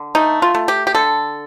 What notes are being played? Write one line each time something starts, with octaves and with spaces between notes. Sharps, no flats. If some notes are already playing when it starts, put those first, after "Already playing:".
Already playing: D3
A3 D#4
F4
A3
G4
G4
D3 A4